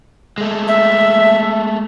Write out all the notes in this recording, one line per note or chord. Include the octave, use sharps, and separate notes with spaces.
G#3 A3
E5